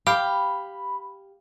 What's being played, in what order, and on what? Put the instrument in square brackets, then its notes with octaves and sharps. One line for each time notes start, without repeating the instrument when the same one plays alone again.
[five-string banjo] G4 [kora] F5 [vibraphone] B5